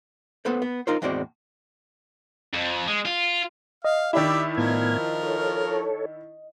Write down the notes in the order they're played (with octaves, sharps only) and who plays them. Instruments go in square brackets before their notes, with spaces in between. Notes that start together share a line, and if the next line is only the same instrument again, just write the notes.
[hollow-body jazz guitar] B3 A4 B4 C5
B3
D#4 F4 A#4 C5
E2 A2 G#3 C4 F#4 D5
[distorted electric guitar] F2
G#3
F4
[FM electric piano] D#5 [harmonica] F5
[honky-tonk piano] D#3 D4 E4 [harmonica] G4 D5 E5
[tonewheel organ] A2 B3 G#6 [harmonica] F3 A#4
[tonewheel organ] A4 C#5